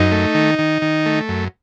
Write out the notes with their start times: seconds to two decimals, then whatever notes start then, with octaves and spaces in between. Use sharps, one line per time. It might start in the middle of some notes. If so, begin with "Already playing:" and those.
Already playing: F#2 D#4
0.12 A3
0.34 D#3
0.59 D#3
0.82 D#3
1.06 A3
1.28 F#2